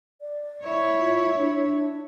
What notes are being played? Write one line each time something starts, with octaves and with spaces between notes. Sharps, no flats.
D5
E4 C#5
F4
D4